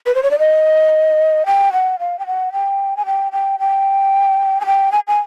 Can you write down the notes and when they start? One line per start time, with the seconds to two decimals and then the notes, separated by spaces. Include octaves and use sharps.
0.06 B4
0.15 C5
0.23 C#5
0.31 D5
0.39 D#5
1.46 G5
1.73 F#5
1.99 F5
2.19 G5
2.26 F#5
2.52 G5
2.97 G#5
3.06 G5
3.32 G5
3.60 G5
4.61 G#5
4.66 G5
4.92 G#5
5.07 G#5